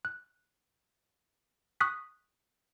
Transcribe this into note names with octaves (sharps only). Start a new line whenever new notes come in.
F#6
C#6 D#6 F#6 B6